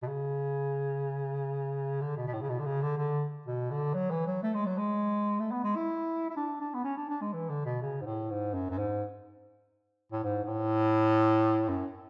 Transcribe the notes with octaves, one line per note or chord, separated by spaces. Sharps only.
B2
C#3
D3
B2
B2
A2
C#3
B2
D3
C#3
D3
D3
B2
D3
F#3
E3
F#3
A3
G#3
F#3
G#3
A3
B3
G#3
E4
E4
D4
D4
B3
C#4
D4
D4
G#3
E3
D3
B2
C#3
G#2
A2
G#2
F#2
F#2
G#2
A2
G#2
G#2
A2
F#2